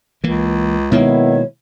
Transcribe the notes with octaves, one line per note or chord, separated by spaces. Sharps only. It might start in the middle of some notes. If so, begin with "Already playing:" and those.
C#2 E3 A#3
B2 D#3 G#3 A#3 B3 E4 C#5